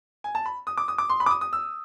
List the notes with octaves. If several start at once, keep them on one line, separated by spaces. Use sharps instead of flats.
G#5
A5
B5
D#6
D6
D#6
D6
C6
B5
D6
D#6
D#6
E6